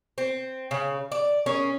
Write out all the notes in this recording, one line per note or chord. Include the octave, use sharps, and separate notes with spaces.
C4
C#3
D5
C#4 G#4 A#4